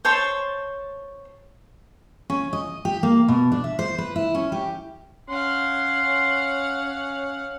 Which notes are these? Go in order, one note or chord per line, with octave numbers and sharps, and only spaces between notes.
C5 C#5 A5 C6
C#4
D#5
G4
A#3
B2
D4
E5
C5
B4
E4
C#4
G4
C#4 F5 F#5 C6